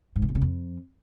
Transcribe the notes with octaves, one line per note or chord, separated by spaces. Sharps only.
G#2
C#3
C3
C#3
F2